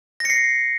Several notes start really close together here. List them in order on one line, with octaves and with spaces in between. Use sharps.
A#6 C#7 C7